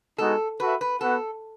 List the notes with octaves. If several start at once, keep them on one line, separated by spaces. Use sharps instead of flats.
G#3 B3 D#4 F#4 A4
F#4 A4 B4 E5
B4
B3 F#4 A4 B4 F#5